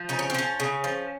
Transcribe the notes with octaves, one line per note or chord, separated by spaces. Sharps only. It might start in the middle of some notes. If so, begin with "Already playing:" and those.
Already playing: F3
C#3 D#4
C#4
C4
F3 C#4
C#3
F3